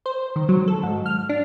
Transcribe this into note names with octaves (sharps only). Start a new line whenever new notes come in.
C5
D#3
F#3
A4
G#2
F6
D4